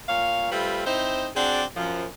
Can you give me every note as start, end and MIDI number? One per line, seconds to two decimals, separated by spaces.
0.08 0.50 46
0.08 0.50 73
0.08 0.50 77
0.52 0.85 55
0.52 0.85 57
0.52 0.85 60
0.52 0.85 65
0.52 0.85 71
0.86 1.27 60
0.86 1.27 63
0.86 1.27 64
0.86 1.27 72
1.36 1.63 60
1.36 1.63 62
1.36 1.63 66
1.36 1.63 68
1.36 1.63 74
1.76 2.05 42
1.76 2.05 53